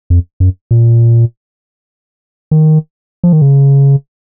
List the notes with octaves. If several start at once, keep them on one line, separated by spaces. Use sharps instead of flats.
F2
F#2
A#2
D#3
F3
D#3
C#3